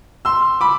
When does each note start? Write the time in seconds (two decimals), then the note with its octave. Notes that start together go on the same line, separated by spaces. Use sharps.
0.25 C6 E6
0.61 B5 D6